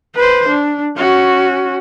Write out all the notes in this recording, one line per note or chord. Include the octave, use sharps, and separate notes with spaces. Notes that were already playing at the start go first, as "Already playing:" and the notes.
B4 C5
D4
C#4 F#4